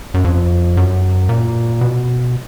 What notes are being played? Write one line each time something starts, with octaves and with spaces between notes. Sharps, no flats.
F#2
F2
F#2
A#2
B2